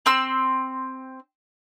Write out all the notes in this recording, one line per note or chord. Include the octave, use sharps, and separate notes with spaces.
C4 C6 E6